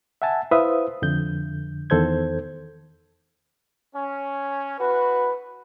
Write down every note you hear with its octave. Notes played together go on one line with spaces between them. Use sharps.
E5 F#5 G#5 A5
E4 B4 C5 E5 F5 D#6
F2 D3 G6
E2 D#3 A4 C5 G6 G#6
C#4
E3 F#4 B4